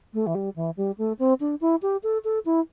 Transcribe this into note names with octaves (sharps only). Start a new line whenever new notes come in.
A3
E3
G3
E3
G3
A3
C4
D4
E4
G4
A4
A4
E4